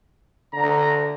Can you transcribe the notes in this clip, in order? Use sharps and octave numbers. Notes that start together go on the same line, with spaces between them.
D3 A#5